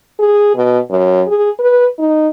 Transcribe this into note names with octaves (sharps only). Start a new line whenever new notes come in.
G#4
B2
F#2
G#4
B4
D#4